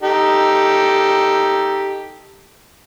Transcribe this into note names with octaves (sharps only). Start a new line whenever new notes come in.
D#4 G4 A4